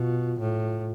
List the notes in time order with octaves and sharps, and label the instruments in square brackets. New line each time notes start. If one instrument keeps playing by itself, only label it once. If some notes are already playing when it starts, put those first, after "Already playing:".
Already playing: [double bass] B2 [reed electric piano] F4
[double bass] A2